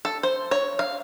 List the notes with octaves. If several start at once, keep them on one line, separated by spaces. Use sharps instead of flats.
A4
C5
C#5
F5